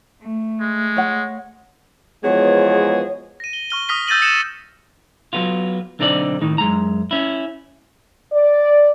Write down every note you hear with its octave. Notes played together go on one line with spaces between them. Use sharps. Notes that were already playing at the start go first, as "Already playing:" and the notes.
A3
G#3
C#5 F#5
E2 F3 G#3 B3 F#4 G#4 C#5
A#6 D#7
G7
C#6 F6 G7
C#6 D#6 F6 A#6 B6 G7
E6 G6 A6 A#6 D#7 F#7
D#6 G6 A#6 C#7 D#7 E7
F#3 B3 F4
B1 D3 C4 D#4 F#4 D5
A2 D#3 D#4
F#2 G#3 A#5
C#4 E4
D5